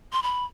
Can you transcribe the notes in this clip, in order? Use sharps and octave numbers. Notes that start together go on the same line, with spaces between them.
C6
B5